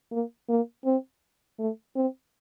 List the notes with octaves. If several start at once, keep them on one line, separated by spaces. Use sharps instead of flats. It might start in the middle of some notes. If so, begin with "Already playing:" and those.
A#3
A#3
C4
A3
C4